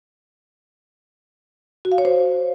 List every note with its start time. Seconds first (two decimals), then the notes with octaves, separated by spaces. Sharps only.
1.85 F#4
1.92 F5
1.98 C#5
2.05 C5